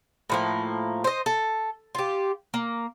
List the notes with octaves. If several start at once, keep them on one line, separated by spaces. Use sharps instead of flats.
A2 F3 A#3
C5 D#5
A4
F4 G4
A#3